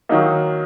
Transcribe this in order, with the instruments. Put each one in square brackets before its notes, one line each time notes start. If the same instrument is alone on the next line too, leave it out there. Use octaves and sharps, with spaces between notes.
[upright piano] D#3 F#3 A#3 D#4